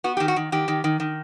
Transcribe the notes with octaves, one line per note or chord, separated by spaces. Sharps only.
B3 F#4
D#3 G4
F#4
D#3
D#3 G4
D#3
D#3
D#3